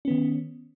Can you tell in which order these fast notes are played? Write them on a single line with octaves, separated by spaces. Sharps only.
C#4 B3 D#3